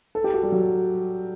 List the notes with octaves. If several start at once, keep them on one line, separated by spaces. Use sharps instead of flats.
A4
G4
F#4
G3
F#3